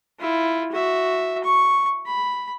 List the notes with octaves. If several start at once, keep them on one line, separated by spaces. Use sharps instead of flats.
E4 F4
F#4 E5
C#6
B5